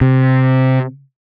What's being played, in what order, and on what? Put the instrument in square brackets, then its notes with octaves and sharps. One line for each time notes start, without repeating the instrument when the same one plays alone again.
[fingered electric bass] C3